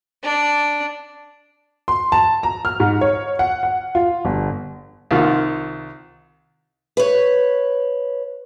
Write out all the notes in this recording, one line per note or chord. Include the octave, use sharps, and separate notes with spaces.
D4
C6
A5
A#5
F6
G#2
C#5
F#5
F#5
F4
G1
C2 D#3 F4
B4 C#5